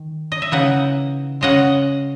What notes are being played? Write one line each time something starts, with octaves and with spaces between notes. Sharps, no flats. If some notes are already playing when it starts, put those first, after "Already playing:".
Already playing: D#3
D#5
E5
C#3 E3 A#3 D#4 D#5 F#5
C#3 G#3 C#4 D#5 F#5